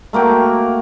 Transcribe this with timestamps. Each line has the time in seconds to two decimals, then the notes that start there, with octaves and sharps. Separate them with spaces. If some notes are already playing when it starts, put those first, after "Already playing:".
0.13 A3 A#3 F#4 G5